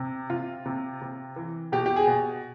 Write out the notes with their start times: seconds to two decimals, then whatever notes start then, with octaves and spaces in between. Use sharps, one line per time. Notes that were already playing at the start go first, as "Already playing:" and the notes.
Already playing: C3
0.30 C3 F4
0.66 C3
1.01 C3
1.36 E3
1.72 B2 G4
1.86 G4
1.96 G#4
2.07 B2